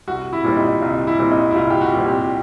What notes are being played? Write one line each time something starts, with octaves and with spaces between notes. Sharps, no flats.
C2 F#4
E4
A#2 G3 C4
D#4
C2 D#4
E4
A#2 G3 C4
D#4
E4
C2 F4
G4
F#4
A#2 G3 C4
G4